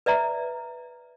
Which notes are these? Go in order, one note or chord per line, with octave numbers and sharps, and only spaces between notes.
B4 D5 E5 A#5